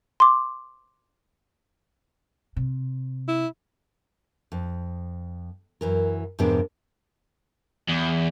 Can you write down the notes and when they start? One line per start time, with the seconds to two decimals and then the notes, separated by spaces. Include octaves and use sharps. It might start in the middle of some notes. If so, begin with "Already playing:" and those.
0.20 C6 D6
2.56 C3
3.28 E4
4.52 F2
5.81 F#2 E3 A#4
6.39 F2 G#2 C3 B3 D4 A#4
7.89 E2